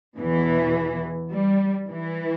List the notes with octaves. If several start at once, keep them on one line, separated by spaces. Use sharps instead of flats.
E2 B2 E3
G3
E3